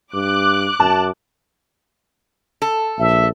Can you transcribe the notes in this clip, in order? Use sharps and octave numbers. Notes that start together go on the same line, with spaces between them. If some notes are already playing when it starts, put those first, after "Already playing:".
G2 D6 F#6
F#2 A5
A4
A#1 E5